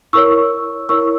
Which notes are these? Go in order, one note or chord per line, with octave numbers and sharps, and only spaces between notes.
E4 A#4 C#5 C#6 E6
E4 A#4 C#5 C#6 E6